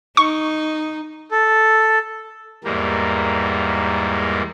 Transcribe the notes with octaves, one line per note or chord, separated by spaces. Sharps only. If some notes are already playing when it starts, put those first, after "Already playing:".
D#4 C#6
A4
E2 G#2 G3 A#3